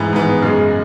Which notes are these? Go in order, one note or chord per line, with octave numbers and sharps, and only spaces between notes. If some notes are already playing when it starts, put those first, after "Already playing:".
Already playing: G#2 E3 B3
G#2 E3 B3
F#2 C#3 G#3